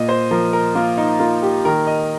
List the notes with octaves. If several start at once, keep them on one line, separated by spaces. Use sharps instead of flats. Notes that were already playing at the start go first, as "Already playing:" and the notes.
Already playing: A#2 D#5
C5
F3 A#4
A#4
A#3 F4
D#4
A#3 F4
G4
D#3 A#4
D#5